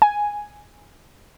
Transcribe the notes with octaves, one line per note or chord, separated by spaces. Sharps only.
G#5